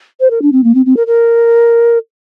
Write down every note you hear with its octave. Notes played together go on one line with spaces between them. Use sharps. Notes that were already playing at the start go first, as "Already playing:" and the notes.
C5
A#4
D4
C4
A#3
C4
C4
A#4
A#4